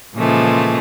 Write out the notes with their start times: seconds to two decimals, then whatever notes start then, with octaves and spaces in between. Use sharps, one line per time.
0.15 A#2 C#3 E3 F3 G#3 A3